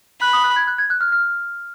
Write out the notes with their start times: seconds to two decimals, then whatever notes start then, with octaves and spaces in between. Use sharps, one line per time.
0.21 B5 F#6
0.33 D#6
0.44 F#6
0.56 G#6
0.67 F#6
0.78 G#6
0.90 F#6
1.01 F6
1.12 F6